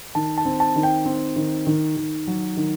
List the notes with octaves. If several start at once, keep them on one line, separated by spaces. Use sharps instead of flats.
D#3 A5
A5
C4
A5
D#3
G5
C4
D#3
D#3
D#3
F#3
D#3